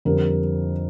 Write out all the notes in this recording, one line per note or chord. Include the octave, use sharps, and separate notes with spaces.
F2 D3 G3 A#4